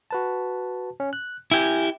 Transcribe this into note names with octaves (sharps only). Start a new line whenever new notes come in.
F#4 B4 A5
C#4
F#6
E4 G4 G#5